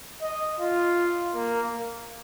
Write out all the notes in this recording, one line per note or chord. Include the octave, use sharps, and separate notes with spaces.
D#5
F4
A#3